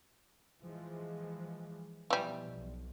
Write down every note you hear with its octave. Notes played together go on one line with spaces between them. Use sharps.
E3 F3 G#3
B2 E3 F3 G3
B1